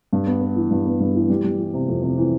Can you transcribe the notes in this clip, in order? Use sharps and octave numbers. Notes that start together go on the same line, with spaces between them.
G2
B3
B3
E3
G2
B3
G2
E3
G3
G3
E3
C3
F2
C3
E3